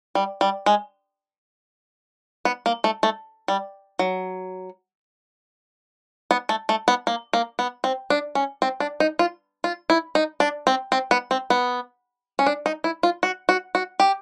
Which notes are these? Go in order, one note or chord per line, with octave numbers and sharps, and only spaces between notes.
G3
G3
G#3
B3
A#3
A3
A3
G3
F#3
B3
A3
A3
B3
A#3
A#3
B3
C4
D4
C#4
C4
D4
D#4
F4
F4
E4
D#4
D4
C4
C4
B3
C4
B3
C#4
D4
D#4
E4
F4
F#4
F#4
F#4
G4